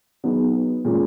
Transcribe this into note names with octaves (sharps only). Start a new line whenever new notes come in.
F#3 B3 D#4 G#4 B4
A#2 G#3 C#4